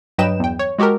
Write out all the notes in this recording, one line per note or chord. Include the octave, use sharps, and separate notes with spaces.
G2 F#3 B4 D#5 G5 E7
E2 G5
C#5
G#3 F#4 G4 A4 A#4